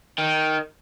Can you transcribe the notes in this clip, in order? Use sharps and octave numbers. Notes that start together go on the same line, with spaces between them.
D#3 G5